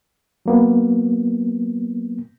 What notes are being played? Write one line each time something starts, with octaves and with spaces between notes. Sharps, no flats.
F#3 A#3 B3